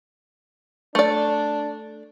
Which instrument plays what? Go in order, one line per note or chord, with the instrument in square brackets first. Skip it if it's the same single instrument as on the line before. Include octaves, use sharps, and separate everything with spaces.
[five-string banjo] A3 D5 [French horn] D4